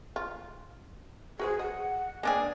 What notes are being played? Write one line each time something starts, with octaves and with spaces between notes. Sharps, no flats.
F4
F#4 G#4 B4 C5
D#5 F#5
G#3 A#3 B3 D4 G#4 G5